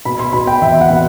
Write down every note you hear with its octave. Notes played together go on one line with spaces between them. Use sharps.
B2 B5
C6
B2 B5
G5
E2 E5
F#5
B2